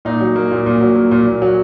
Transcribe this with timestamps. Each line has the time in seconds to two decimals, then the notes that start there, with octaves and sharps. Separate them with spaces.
0.05 A#2 D#4
0.21 F#3
0.36 A#3
0.51 A#2
0.66 A#2
0.81 F#3
0.96 A#3
1.11 A#2
1.27 A#2
1.42 F#3